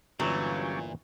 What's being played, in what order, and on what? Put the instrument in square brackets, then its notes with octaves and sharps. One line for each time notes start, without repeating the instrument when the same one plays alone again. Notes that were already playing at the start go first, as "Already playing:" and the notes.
[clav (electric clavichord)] G1 E3 [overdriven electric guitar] A#2 [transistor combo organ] D3 G3 C#4 [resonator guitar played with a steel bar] F#3